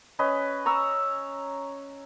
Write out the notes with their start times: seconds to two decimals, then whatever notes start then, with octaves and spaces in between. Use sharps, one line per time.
0.19 C#4 B4 D#5
0.66 A#5 C#6 E6